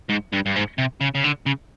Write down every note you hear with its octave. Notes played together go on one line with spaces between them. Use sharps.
G#2
G2
G2
G#2
C3
C#3
C#3
D3
C#3